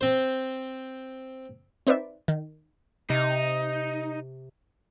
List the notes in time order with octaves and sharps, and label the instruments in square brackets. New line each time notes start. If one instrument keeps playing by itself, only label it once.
[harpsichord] C4 C5
[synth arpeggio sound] C4 D#4 B4 C5 D5 E5
D#3
[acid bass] C3 [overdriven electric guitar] D#4